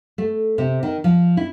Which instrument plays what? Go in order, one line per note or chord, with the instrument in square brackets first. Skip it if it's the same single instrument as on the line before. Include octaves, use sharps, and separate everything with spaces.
[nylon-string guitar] A3
C3
D#3
F3
E4